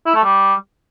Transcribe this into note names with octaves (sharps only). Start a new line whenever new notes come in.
E4
A3
G3